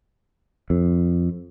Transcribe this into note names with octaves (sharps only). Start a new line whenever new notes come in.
F2